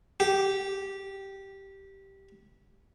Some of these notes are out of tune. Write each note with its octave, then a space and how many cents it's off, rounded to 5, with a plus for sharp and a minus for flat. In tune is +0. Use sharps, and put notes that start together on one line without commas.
G4 -10